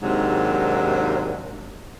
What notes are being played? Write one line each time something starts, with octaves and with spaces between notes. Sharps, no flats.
D#2 G#2 C3 F#3 D4